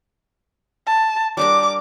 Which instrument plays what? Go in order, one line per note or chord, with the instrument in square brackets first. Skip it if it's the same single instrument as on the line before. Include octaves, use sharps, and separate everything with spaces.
[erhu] A5
[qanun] G3 D4 A#4 [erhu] D6